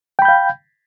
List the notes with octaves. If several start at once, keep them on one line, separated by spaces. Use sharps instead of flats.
F5 G5 B5 G6